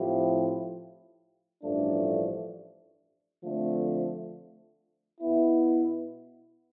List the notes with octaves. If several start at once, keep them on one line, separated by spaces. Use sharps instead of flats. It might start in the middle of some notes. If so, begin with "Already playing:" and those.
Already playing: A2 F3 C4 E4 G4
A1 G2 F3 A3 D4
D3 F3 A3 C4
B2 B3 E4